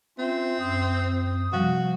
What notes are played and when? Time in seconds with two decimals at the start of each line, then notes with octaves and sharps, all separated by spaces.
0.18 C4 C#4 F4 E5
0.60 F#2 D#6
1.53 C3 F3 G3 F#4